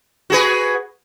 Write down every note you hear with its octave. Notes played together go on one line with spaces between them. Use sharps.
F#4 G#4 B4